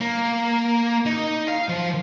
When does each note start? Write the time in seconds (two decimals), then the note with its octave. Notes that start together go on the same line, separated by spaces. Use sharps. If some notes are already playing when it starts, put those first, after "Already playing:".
0.01 A#3
1.06 D#4
1.48 F5
1.69 F3